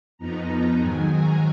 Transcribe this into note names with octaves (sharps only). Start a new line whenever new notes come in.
F2 F3 B3 D#4 A#5
A#5
G#2 D#3 F#3 G#5
A#5